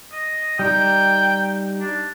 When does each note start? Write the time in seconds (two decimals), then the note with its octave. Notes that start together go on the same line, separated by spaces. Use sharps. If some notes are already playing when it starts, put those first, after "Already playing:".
0.12 D#5
0.59 G3 D#4 G4 G5
1.80 D4